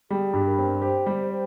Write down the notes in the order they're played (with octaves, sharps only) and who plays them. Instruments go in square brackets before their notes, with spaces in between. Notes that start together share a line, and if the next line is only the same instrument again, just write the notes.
[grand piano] G3 [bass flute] G#4
[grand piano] G2
[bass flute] A#4
[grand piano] C4
[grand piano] G4 [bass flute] C5
[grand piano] G3